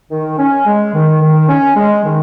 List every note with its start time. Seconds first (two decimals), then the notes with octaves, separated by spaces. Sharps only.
0.11 D#3
0.39 C#4
0.67 G#3
0.94 D#3
1.22 D#3
1.49 C#4
1.77 G#3
2.05 D#3